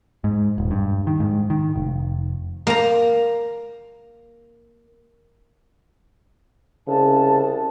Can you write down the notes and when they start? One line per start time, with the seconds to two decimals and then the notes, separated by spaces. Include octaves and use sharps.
0.24 G#2
0.58 D#1
0.71 G2
1.07 D#3
1.20 G#2
1.50 D#3
1.76 F1
2.67 A#3 A#5
6.87 C2 C#3 A5